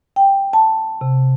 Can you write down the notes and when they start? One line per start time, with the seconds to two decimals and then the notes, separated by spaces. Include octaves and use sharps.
0.16 G5
0.53 A5
1.01 C3